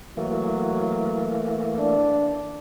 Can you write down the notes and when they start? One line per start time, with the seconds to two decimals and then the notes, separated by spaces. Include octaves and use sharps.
0.17 E3 F#3 A3 A#3
1.79 D4